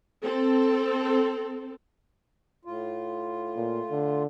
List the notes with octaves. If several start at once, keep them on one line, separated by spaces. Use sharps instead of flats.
C4 A4
A2 F4
A#2
D3